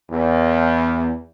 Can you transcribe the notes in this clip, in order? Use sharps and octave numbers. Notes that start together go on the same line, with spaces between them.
E2